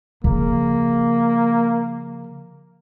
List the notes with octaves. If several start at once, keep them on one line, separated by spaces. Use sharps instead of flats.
C#3 F3 A#3